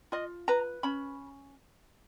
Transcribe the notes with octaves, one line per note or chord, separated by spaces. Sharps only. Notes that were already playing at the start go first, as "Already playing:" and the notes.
F4 D#5
B4 A#5
C#4 B5